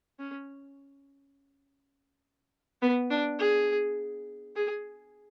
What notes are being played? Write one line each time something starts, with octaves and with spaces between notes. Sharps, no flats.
C#4
B3
D4
G#4
G#4